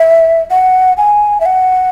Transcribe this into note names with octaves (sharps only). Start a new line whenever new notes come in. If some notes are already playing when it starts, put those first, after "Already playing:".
Already playing: E5
F#5
G#5
E5
F#5